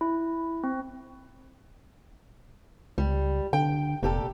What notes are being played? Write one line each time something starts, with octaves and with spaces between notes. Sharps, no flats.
E4
C4
C#2 G3
D3 G5
F1 A#2 G4 A4